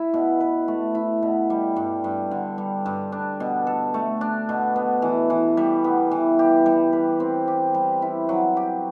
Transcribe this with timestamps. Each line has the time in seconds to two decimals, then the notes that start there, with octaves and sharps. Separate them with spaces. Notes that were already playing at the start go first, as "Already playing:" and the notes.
Already playing: E4
0.14 B2
0.40 B4
0.68 A3
0.95 E4
1.22 B2
1.50 G3
1.76 G2
2.04 G2
2.31 D3
2.58 G3
2.86 G2
3.12 D4
3.40 B2
3.67 A4
3.94 A3
4.21 D4
4.49 B2
4.76 B3
5.02 E3
5.30 E3
5.57 G3
5.84 B3
6.11 E3
6.39 G4
6.66 G3
6.93 B4
7.20 C4
7.48 G4
7.74 G3
8.02 E4
8.29 F#3
8.57 G4